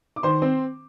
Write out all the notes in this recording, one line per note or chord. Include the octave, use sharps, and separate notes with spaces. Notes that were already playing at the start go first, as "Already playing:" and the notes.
D6
D#3 C5 C6
C4